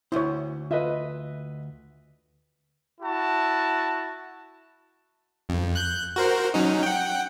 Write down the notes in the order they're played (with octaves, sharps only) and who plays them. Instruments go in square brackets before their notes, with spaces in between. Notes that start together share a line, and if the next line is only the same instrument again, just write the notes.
[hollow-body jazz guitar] D2 C5 [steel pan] E4 C#5
[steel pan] F4 [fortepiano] B4 D#5 E5
[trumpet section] E4 F#4 A5
[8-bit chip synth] F2
F#6 G6
F#4 A#4 C5
F#3 C#4 D#4
F#5 G5